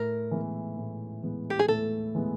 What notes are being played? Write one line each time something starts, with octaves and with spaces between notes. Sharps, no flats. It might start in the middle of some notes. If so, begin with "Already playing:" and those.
Already playing: A2 A#4
E3 G#3 B3
A2
E3 G#3 B3
G4
G#4
A2 A4
E3 G#3 B3